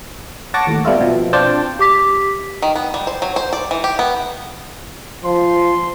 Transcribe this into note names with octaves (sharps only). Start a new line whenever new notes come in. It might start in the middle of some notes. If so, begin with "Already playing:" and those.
C#5 F#5 A5 C#6 D6 A#6
D#2 A2
B2 G3 E4 F4 A4
B2 F3
C4 D4 F4 C5 G5 A5
G4 D6 B6
D#3
B3
G3
C5
F#3
C5
D5
E3
G4
B3
F3 C6